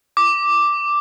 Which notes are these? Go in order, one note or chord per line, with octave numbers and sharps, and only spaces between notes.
D6